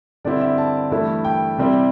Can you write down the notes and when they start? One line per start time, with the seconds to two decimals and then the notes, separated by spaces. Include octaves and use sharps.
0.25 G2 D3 C4 E4 D5
0.41 E5
0.58 A5
0.91 G2 E3 A3 E4
1.25 G5
1.58 C3 G3 C4 E4